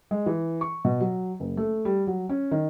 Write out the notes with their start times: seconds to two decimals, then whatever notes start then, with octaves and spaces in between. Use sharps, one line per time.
0.11 G#3
0.26 E3
0.61 C#6
0.85 B2
1.00 F#3
1.40 F#1
1.57 A3
1.85 G3
2.07 F#3
2.29 C#4
2.51 D#3